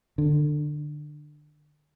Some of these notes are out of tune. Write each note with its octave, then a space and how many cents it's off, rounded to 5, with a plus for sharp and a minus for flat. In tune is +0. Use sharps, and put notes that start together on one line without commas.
D3 +20